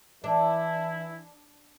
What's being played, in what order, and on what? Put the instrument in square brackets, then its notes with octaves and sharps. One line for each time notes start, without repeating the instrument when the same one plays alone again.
[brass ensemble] E3 E4 [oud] D4